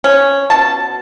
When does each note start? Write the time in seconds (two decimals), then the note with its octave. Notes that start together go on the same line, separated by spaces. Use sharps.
0.04 C#4
0.50 B2 A5